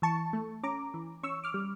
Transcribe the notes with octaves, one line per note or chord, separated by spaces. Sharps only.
E3 A5 C#6
A3
C#4 A#5 D6
E3
C#4 C#6 E6
D6 F6
G3